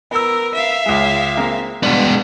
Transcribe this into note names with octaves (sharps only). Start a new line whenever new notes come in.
B3 A#4 E6
E5 F5
C#2 G#3
G#3 A#3 C4
G2 B2 G#3 B3 D4